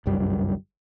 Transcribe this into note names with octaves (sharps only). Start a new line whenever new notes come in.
G1 C2 F#2 G3